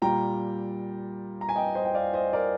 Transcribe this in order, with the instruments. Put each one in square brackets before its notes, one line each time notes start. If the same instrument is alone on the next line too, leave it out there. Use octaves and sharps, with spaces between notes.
[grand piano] A#2 G3 G5 A#5
A#5
G#5
D#5 G5
C5 D#5
G5
D5 F5
C5 D#5
A#4 D5